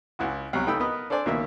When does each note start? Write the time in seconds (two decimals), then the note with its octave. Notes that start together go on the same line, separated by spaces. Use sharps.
0.19 C#2 E4 F#4
0.53 C2 B2 F#3
0.67 C#2 A3 D#4 G5 B5 E6
0.80 B3 A#4 B4 D#5
1.10 D4 A4 C5 D5 G#5
1.26 C#2 B2 D#3 A#3 E5